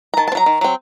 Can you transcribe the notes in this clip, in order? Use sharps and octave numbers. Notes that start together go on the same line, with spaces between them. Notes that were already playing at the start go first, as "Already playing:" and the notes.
A#5
D#3 A5
A5
C4
F#3 A#5
D#3
F#3 C4